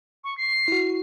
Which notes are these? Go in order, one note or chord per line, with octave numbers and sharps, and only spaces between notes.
C#6
C7
E4 F#4